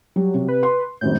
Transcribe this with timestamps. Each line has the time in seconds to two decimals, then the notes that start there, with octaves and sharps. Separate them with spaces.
0.16 F#3 G3
0.34 C3
0.49 B4
0.63 C6
1.01 G#1 F#2 A2 G6